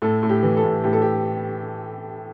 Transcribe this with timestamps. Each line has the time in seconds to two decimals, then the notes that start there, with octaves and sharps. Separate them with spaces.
0.02 A2 A4
0.23 A2
0.29 G4
0.43 E3
0.57 A4
0.63 A2
0.84 A2 G4
0.93 A4
1.02 G4